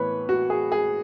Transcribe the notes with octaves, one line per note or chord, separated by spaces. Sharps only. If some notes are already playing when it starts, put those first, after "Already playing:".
Already playing: A2 E3 B3 B4 C#5
F#4
G#4
G#4